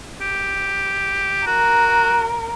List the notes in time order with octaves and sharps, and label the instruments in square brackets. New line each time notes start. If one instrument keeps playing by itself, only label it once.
[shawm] G4
[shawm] F#4 [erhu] A#4